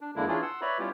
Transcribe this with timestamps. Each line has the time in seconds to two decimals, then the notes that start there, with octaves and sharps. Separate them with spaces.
0.01 D4
0.16 E2 D3 G#3 A#3 D4 E4
0.28 E3 C#4 D4 E4 F4 G#4
0.42 F#5 C6 E6
0.61 B4 C#5 D5 E5 A#5 B5
0.79 G3 B3 C#4 E4 F4 G4